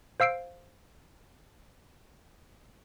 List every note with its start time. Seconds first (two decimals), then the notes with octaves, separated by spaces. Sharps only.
0.20 C5 F5 E6 C7 D7